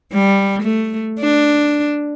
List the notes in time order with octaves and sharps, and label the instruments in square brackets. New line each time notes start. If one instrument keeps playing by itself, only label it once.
[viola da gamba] G3
A3
D4